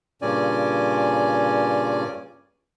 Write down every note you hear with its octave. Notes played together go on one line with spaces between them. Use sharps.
G2 A#2 C#3 C#4 D5 G#5